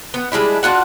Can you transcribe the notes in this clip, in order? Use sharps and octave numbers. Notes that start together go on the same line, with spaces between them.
B3
G3 G#3 D4 E4
D4 F4 F#4 F#5